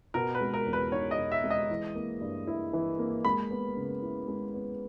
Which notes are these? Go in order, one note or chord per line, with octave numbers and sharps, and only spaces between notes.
B2 A#4
B4
G#3
A#4
E2
B4
D#4 C#5
D#5
B2
E5
G#3
D#5
E3
A#3
G2
E4
E3
A#3
G#3 B5
B3
C#3
E4
G#3
B3